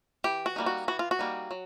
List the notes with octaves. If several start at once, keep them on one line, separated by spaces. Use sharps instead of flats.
E3 G4
F#4
G3 A#3 D#4
F#4
E3 F#4
F4
F#4
G3 A#3 D#4
F#3